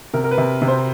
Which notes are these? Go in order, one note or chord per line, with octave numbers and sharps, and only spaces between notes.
C3 A#4
A#4
B4
C3
C3
C5